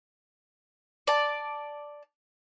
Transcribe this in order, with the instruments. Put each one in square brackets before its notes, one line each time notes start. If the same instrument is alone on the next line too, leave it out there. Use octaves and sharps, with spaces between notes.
[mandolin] D5 A5